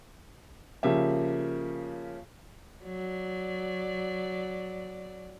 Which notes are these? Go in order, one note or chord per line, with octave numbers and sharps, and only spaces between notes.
C#3 F3 A#3 G4 E5
F#3 D5